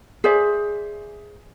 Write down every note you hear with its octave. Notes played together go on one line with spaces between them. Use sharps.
G#4 C5 D5 E5